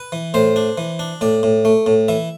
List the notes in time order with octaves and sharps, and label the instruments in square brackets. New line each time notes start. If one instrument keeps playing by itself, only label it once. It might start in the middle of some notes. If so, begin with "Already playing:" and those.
Already playing: [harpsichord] B4
E3
A2 C5
D4
E3
D4
A2 D5
A2
A3
A2
E3 E5